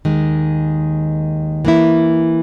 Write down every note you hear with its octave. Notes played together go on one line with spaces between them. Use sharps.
D#2 D#3 G#3
E3 A#3 E4